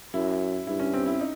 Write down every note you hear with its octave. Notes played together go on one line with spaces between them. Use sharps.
F#2 E4
G2 E4
C#4
C4
E4
D#4